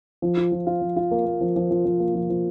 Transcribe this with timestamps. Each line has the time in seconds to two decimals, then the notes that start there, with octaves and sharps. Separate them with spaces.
0.22 F3
0.37 F4
0.52 F3
0.67 F4
0.81 F3
0.96 F4
1.11 A#3
1.26 A#3
1.41 F3
1.56 F3
1.71 F3
1.85 F3
2.00 A#3
2.14 F3
2.30 F3